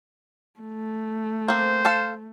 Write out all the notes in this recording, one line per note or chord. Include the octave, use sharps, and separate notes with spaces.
A3
A#3 C4 C5
A4 F5 A5